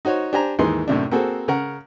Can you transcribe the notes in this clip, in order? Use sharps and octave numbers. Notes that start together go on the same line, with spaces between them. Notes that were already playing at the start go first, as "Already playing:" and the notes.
D#4 F#4 C5 C#5
D4 G4 C5 G#5 A#5
D#2 G#2 E3 G#4 C6
F#2 A2 C3 D4
A#3 C4 F#4 G#4 A4 C5
C#3 A#4 F#5